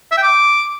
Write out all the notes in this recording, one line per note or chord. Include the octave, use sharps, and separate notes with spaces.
E5
G5
D6